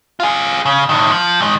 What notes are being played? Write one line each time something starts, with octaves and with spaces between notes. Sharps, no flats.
F4 G#4
C#3
A2 D#3
F3
D#3 G#3